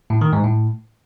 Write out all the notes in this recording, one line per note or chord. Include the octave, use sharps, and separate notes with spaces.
A2
D#3
G#2
A2